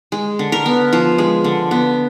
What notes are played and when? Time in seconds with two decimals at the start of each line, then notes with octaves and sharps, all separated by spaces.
0.12 G#3
0.39 D3
0.52 A#4
0.66 B3
0.93 F3
1.18 G#3
1.44 D3
1.71 B3